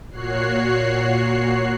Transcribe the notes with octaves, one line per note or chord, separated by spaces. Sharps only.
A#2 F#4 C#5 F#6 C7